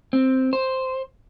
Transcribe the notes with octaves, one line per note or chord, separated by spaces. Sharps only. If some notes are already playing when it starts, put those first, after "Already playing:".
C4
C5